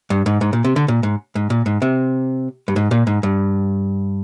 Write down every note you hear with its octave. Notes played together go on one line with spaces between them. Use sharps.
G2
G#2
G#2
A#2
C3
D3
A#2
G#2
G#2
A#2
G#2
C3
G2
G#2
A#2
G#2
G2